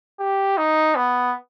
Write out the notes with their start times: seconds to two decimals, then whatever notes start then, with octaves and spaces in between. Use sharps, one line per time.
0.19 G4
0.57 D#4
0.96 B3